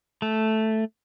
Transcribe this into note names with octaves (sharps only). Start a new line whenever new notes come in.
A3